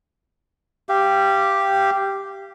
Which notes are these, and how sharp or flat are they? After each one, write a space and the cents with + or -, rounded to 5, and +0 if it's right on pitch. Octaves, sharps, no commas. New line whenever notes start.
G4 +0 F5 -30